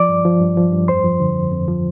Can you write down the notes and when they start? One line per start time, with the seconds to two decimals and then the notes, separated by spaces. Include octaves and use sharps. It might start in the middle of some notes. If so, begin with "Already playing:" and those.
Already playing: F3 D5 D6
0.09 G2
0.25 F3
0.41 G2
0.57 F3
0.72 G2
0.88 F2 C5 C6
1.04 F3
1.20 D3
1.36 F2
1.52 F2
1.68 F3